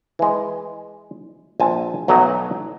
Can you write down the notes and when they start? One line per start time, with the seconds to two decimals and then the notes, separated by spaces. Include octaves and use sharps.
0.19 E3 G#3
1.60 A#1 C4 G#5 A5
2.08 B1 F#3 A3 C#5 D#5 A#5